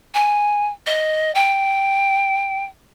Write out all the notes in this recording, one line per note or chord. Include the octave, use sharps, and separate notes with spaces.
G#5
D#5
G5